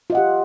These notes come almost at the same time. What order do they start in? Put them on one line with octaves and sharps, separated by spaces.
F4 D#5 F#5 G4